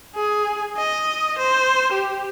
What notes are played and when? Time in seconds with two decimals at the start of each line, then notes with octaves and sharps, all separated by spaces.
0.15 G#4
0.77 D#5
1.38 C5
1.93 G4